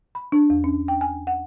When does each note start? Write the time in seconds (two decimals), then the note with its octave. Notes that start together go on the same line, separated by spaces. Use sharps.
0.15 B5
0.32 D4
0.50 E2
0.64 C#4
0.88 G5
1.01 G#5
1.27 F#5